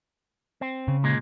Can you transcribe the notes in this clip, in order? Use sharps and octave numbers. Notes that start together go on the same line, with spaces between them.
C4
C#3
A#2 G#3